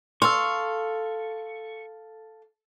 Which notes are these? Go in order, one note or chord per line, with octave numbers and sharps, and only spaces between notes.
A4 F5 C6 C#6 E6